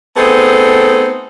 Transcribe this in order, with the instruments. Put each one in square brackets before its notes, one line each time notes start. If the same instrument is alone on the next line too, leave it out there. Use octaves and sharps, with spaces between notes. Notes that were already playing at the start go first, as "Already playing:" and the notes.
[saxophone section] A3 B3 C4 D#4 G#4 A4